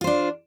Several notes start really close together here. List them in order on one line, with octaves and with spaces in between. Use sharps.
F4 C5 D4